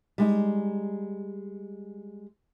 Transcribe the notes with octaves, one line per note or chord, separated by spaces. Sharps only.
G3 G#3 D#4